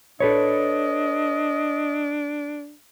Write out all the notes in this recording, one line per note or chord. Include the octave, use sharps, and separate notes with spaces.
D4 A4 B4 C#5 D#5